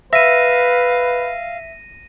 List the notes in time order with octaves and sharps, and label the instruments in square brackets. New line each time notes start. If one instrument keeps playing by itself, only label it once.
[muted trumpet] B4 [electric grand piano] E5 [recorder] F5 [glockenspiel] A#6 D#7